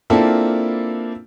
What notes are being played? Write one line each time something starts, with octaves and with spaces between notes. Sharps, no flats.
A#3 C4 D4 E4 F4 A4